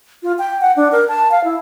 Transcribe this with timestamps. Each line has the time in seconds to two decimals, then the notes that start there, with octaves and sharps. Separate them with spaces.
0.23 F4
0.39 G5
0.61 F#5
0.77 D4
0.92 A#4
1.09 A5
1.32 F5
1.44 E4